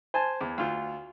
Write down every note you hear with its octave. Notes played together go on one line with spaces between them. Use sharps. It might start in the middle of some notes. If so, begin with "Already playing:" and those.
C5 G#5 A5
E2
D2 F4